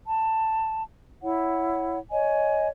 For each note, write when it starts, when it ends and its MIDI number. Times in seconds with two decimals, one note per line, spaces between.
0.07 0.83 81
1.22 1.99 64
1.22 1.99 73
1.22 1.99 78
2.11 2.68 73
2.11 2.68 75
2.11 2.68 80